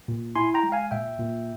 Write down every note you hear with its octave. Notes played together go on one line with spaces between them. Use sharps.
A#2
E4 G#5 C6
G5 A#5
G#3
F5 G#5
A#2 E5 G5
A#2